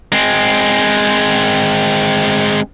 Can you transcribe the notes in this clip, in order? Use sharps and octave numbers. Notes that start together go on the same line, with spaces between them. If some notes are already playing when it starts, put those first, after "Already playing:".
G#3 C4